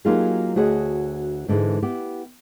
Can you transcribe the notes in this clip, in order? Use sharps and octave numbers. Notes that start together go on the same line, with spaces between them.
F#3 A#3 D#4 F4 G4 G#4
D2 F#4 G#4 C#5 D#5
G#2 D3 E3 G#3
B3 E4 G4